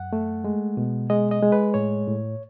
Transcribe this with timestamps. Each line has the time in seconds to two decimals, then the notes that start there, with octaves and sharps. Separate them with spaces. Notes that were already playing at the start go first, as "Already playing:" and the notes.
Already playing: F#2 F#5
0.13 A3
0.44 G#3
0.77 B2
1.10 G#3 D#5
1.31 D#5
1.43 G#3
1.52 B4
1.74 A2 C#5
2.07 A2